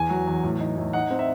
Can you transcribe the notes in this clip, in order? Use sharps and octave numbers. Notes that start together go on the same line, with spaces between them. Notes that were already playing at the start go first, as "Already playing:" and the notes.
Already playing: E2 G#5
F#3
E2
A2
D#4
A2
D#4 F#5
C4
E5